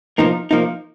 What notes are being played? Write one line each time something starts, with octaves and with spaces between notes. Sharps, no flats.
F3 A#3 D#4
F3 A#3 D#4